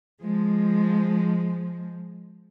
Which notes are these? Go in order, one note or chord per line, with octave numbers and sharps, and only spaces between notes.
F3 G#3